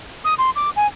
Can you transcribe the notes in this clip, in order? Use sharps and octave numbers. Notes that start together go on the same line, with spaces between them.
D#6
C6
D6
G#5